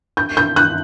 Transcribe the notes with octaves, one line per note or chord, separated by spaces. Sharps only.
G6
G6
F#6